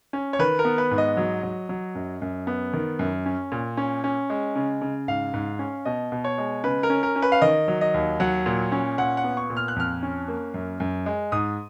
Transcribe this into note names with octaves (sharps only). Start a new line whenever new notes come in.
C#4
C#5
D#3 B4
A#4
B3
B4
G#2
D#5
F#3
F#3
F#3
F#2
F#2
B3
D#3
F#2
C#4
A#2
C#4
C#4
G#3
C#3
C#3
G#2 F5
G#2
C#4
B2 D#5
B2
C#5
G#3
C#3 B4
A#4
C#4
A#4
C#4
B4
F5
D#3 D#5
F#3
D#5
D#2
F#3 F#5
A#2
C#4
A#2 F#5
F#5
B3
C#6
A#2
F6
F#6
F2 F6
C#4
A#3
F#2
F#2
G#3
G#2 D#6